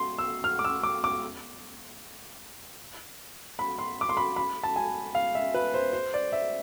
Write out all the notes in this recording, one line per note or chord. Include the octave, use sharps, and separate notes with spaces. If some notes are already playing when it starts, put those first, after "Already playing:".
Already playing: C6
E6
F6
D6
E6
D6
D6
B5
C6
D6
C6
B5
B5
A5
G#5
F5
E5
B4
C5
C5
D5
E5